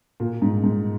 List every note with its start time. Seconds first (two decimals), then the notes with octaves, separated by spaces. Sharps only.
0.20 A#2
0.42 G#2
0.64 G#2